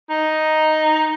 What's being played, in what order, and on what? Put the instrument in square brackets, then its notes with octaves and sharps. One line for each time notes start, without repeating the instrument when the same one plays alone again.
[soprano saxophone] D#4